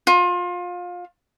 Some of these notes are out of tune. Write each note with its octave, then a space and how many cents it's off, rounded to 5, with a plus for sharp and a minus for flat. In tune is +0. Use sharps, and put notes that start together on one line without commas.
F4 +25